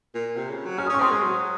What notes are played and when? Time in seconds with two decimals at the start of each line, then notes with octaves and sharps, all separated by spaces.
0.15 A#2
0.36 C3
0.50 C#3
0.65 F#3
0.78 C#4 F6
0.87 D#6
0.89 C#4 C#6
1.00 C4 C6 D#6
1.11 G#3
1.22 F#3